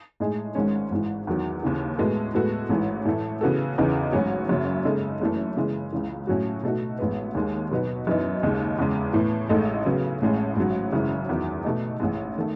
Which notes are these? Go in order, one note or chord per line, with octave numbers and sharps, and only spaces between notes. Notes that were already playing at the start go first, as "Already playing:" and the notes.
A2 G#3 D#4 G#4
G#1 G#2 D#3 G#3 C#4
G#1 G#2 E3
E2 D#3 F#3
D#2 C#3 E3
A2 G#3 B3 F#4 A4
A2 G#3 B3 F#4 A4
A1 G#2 E3
A2 E3 A3
C#3 E3 B3 F#4 A4
E2 C#3 E3 B3 D#4
A1 G#2 F#3 C#4 F#4
F#1 F#2 C#3 F#3
C#3 G#3 D#4 A4
F#1 F#2 E3 A3
C#3 E3 G#3
C#2 C#3 E3
A2 F#3 C#4 F#4
B2 A3 D#4 F#4
A1 A2 G#3 B3
D#2 D#3 G#3
B2 F#3 B3 D#4 F#4
F#2 E3 B3 D#4
D#2 C#3 G#3 D#4
E2 C#3 G#3
A2 E3 B3
A1 A2 G#3 D#4 A4
C#3 F#3 B3
A1 A2 G#3 C#4
A1 G#2 F#3 C#4
G#1 F#2 C#3 E3
E2 D#3 F#3
B2 A3 D#4
A1 G#2 E3 G#3
D#3 A3